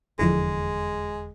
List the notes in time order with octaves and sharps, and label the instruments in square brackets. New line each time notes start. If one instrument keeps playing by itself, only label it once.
[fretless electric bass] F1 E2 D3 [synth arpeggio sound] F3 E4 G#4 [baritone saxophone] G#3